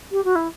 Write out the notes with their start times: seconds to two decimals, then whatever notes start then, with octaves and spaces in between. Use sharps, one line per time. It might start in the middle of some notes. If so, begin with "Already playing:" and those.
0.12 G4
0.24 F#4
0.35 E4